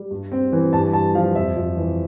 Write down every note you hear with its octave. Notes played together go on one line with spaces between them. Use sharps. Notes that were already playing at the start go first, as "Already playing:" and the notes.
Already playing: G3
G2
C4
E3
G2 A5
G2 A5
F3 F5
F2 E5
F2
E3